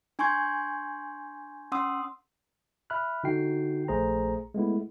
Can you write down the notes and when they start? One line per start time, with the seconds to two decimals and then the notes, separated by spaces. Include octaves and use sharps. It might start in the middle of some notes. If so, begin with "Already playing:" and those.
0.19 D4 G#5 C6 C#6 G6 G#6
1.72 C#4 F#5 C6 D#6 E6
2.90 E5 B5 F6 F#6
3.24 D3 D#4 F#4 G5 C7
3.88 A#1 A3 G#4 C5 A#5
4.54 G#3 A3 B3 E4